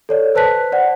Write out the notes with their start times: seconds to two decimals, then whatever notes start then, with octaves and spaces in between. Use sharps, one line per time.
0.09 A4 C#5 D5
0.35 B4 C5 A5 F#6 B6
0.72 C5 D5 F#5